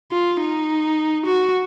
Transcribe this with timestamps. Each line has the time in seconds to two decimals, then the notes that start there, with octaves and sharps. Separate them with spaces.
0.12 F4
0.41 D#4
1.26 F#4